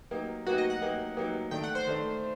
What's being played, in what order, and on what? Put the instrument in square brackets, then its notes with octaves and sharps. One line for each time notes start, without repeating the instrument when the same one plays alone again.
[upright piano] F#3 A#3 D#4 G4
[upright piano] F#3 A#3 D#4 G4 [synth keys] F#4
[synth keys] D#5
F#5
[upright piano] F#3 A#3 D#4 G4
F#3 A#3 D#4 G4
[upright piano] D#3 A3 D4 [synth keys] G5
[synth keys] F#5
C5
[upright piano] D#3 A3 D4